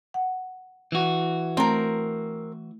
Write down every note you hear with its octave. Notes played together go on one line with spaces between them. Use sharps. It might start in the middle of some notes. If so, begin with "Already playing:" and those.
F#5
E3 F#4
A3 C4 A#4 A#5